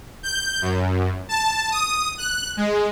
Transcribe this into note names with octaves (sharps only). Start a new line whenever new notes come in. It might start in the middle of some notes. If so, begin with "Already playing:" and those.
G6
F#2
A5
D#6
F#6
G#3